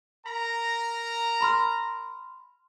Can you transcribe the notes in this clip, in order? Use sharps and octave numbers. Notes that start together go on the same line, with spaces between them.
A#4 A#5
B5 C6 F6